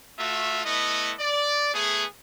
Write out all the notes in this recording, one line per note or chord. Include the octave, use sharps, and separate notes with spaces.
A3 F4 F#4 E5
A3 B3 E4 D#5
D5
A3 B3 G#4